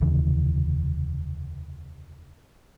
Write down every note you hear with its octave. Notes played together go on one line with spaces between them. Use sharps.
F1 D#2 C#3 E3